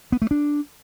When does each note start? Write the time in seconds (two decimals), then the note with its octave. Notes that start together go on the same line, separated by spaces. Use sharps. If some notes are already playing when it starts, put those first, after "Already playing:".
0.12 B3
0.22 A3
0.31 D4